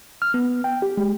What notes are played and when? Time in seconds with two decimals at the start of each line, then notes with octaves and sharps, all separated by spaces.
0.22 F6
0.34 B3
0.64 G5
0.82 G4
0.97 G#3